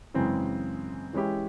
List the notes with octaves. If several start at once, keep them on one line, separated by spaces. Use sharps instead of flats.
F#2 C#3 E3 G#3 C4
E3 G#3 C#4 E4 G4